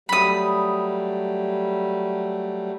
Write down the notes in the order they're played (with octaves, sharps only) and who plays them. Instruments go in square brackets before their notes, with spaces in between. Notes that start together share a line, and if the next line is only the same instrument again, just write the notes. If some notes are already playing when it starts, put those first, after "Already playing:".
[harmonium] F#3 G3 A3 [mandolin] B5 D#6